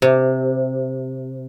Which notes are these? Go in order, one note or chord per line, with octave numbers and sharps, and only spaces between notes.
C3